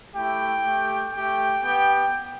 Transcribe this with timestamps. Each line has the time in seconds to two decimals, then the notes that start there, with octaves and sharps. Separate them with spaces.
0.14 A3 E4 G4 G5
0.64 A3 G4
1.13 A3 G4 G5
1.64 B3 G4 G5